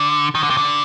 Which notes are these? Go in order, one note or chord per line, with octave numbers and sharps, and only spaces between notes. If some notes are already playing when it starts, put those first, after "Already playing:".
Already playing: D3
D#3
D3
C3
D3